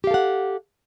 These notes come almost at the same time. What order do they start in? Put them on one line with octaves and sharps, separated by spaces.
G4 F5 A4 F#5